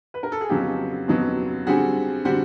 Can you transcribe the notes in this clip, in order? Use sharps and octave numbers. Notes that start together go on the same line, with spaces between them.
B4
A#4
A4
G#4
F2 C#3 F#3 B3 D#4 F4 G4
F2 C#3 F#3 B3 D#4
D3 G3 C4 F#4 G#4
D3 G3 C4 F#4